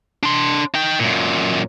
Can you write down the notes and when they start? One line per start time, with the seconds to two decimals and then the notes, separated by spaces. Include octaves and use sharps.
0.23 D4 C6
0.74 D#4 G5
1.00 F#2 A#2